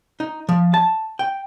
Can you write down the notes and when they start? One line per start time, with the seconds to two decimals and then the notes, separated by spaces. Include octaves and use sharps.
0.20 D#4
0.49 F3
0.74 A5
1.19 G5